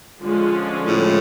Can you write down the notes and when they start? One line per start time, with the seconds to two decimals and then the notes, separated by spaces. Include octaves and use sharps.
0.21 D3 F3 G#3 C#4
0.88 A2